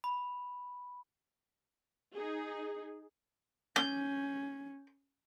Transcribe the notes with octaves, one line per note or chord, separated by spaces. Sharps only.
B5
D#4 G#4
C#4 G6